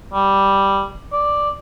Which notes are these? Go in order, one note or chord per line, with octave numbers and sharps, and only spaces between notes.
G3
D5